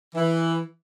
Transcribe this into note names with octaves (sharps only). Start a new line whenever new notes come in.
E3